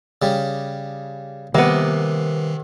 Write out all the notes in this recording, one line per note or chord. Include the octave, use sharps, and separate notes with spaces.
C#3 G3
C3 D#3 G3 A#3 B3